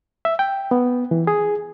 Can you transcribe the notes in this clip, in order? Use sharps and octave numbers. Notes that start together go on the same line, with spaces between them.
E5
G5
B3
E3
G#4